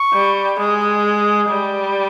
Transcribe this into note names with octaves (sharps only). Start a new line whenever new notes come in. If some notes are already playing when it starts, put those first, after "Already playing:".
Already playing: C#6
G3
G#3 D#6
D#6
G3